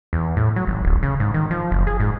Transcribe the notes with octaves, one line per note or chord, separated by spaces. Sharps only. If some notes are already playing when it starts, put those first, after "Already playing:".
E2
A2
F#3
G#1
D1
C#3
G#2
D#3
F3
F#1
G#4
G#2